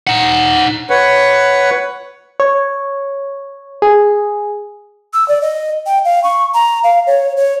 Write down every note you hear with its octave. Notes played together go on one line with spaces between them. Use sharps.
D#4 F#5
B4 C#5 F#5
C#5
G#4
E6
D5
D#5
G5
F5
C#6
A#5
F5
C#5
C#5